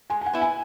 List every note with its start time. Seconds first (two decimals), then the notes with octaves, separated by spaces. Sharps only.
0.10 G#3 G#5
0.21 G#5
0.26 F#5
0.33 B3 E4
0.42 G#5